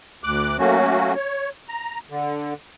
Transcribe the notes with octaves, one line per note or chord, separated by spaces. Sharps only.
D2 D6 F#6
F#3 A3 A#3 C#4 F#4
C#5
A#5
D3